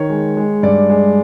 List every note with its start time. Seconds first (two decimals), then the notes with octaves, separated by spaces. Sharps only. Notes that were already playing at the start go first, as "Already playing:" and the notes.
Already playing: D#3 C#5
0.10 G#3
0.37 G#3
0.63 G2 D5
0.90 G#3